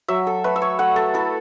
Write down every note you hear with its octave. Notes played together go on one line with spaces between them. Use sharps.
F#3 E5
A4
A3 B4
E5
C#5
A3 F#5
A4
E4 A4